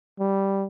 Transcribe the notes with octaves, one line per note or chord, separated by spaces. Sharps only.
G3